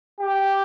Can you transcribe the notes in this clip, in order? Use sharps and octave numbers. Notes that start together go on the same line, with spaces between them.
G4